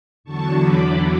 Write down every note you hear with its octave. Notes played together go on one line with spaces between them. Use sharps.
E2 D3 F#3 A5 C#6
B5 D6